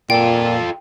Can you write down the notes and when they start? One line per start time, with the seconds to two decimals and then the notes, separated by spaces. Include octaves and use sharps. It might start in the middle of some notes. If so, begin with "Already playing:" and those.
0.10 A#2 F4 A4 G5